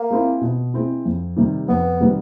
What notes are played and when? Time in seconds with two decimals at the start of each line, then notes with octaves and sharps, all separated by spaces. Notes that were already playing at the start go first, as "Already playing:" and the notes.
Already playing: A#3
0.11 G#3 C4 E4
0.41 B2
0.74 G#3 C4 E4
1.05 F2
1.36 C3 D#3 G3
1.68 F2 B3
2.00 C3 D#3 G3